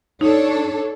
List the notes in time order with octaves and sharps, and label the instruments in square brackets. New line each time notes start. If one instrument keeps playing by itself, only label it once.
[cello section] D4 A4 C#5 [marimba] D#4